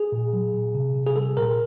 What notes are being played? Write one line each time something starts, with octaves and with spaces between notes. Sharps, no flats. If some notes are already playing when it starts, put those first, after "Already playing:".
Already playing: G#4
A#2
F#3
A#2
C3
C3
G#4
G3 A4
A#2 A#4